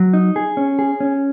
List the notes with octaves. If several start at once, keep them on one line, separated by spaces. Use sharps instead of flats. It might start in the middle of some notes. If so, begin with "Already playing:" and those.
Already playing: F#3
D#4
G#4
C#4
G#4
C#4